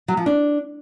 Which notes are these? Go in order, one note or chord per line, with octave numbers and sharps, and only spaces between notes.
F#3
F3
D4